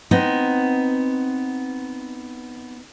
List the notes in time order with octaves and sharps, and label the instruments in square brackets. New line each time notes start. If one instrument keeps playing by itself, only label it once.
[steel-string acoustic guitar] B3 C4 D#4